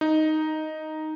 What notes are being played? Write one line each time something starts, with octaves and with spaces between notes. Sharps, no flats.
D#4